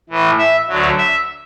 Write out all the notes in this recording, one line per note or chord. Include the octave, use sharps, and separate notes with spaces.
A2 E3
E5
D2 D3 F#3
E5